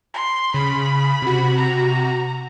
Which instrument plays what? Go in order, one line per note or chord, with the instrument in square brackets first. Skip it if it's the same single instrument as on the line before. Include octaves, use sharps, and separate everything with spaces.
[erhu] C6
[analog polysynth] C#3 [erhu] B5
[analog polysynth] C3 F#4
[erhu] A#5